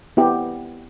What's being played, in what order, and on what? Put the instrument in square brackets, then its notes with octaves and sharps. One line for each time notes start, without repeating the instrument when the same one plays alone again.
[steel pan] B3 E4 G4